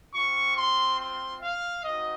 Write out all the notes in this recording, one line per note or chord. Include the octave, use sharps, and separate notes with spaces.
C4 F4 C#6
C6
C6
F5
C4 D#4 F#4 D#5